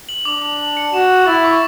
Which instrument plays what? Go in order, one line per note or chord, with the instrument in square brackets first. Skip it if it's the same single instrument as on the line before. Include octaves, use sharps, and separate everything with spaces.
[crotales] F#7
[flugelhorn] D4 [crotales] D6
[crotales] F#7
F#7
C#7
[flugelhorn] F#4 [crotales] E7
[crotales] E7
[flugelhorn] E4 [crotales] A6
[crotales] C#6